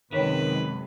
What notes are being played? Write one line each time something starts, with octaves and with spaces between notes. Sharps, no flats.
F#2 C3 D#3 G#3 G#4 B4 C#5 G5